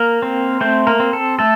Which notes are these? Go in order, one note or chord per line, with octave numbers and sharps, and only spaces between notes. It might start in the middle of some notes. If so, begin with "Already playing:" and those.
Already playing: A#3 A#4
C4
A3 C4 C5
A#3 A#4
C4
A4
A3 A4